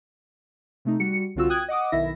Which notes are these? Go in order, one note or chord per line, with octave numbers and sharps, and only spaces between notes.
C3 A3 D#4
G3 F#4 C#7
C2 D3 C4 F4 F#4 E6
G5 D#6 F#6 G#6
D#5 F#5 D6 D#6
B1 D#3 E4 E5 A#6